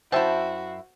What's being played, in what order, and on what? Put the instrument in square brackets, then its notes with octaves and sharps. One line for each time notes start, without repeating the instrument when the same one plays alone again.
[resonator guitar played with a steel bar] F#2 E4 [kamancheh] F#4 [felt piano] C5 [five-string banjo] E5 G5 A5